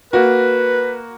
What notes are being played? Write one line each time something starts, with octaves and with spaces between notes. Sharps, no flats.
A#3 F#4 B4